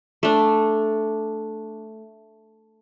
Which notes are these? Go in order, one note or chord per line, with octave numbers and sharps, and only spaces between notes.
A3 D4